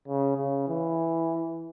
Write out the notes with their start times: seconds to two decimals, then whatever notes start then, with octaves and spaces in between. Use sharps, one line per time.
0.08 C#3
0.37 C#3
0.68 E3